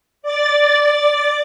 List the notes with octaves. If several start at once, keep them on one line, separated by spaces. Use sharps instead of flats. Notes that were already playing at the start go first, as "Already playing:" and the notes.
D5 A6